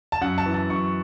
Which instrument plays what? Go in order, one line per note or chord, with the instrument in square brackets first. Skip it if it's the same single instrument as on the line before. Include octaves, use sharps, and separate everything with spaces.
[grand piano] A5
F#2 F#5
A5
E3
A5
F#2 C#6